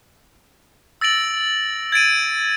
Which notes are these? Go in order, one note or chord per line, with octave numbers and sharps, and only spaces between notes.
E6 A6 A#6 D7 F#7
G#6 A6 D7 D#7